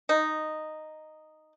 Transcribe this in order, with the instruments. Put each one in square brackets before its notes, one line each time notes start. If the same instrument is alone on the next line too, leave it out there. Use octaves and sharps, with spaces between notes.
[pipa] D#4